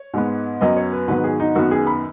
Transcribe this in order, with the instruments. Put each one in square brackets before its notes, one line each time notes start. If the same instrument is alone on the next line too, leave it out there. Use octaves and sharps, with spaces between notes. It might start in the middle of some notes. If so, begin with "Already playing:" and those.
Already playing: [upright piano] C#5
G#2 G#3 B3
F#2 F#3 B3 D#5
C#5
B4
G#2 D#3 F#3 B3 B4
G#4
D#4
F#2 D#3 B3 F#4
G#4
B5